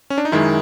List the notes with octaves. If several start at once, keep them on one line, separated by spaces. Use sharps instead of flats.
C#4
D4
D#4
F#2 D#3 G#3 E4